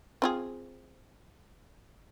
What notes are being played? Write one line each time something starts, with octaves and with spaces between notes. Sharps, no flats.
C4 F4 G#4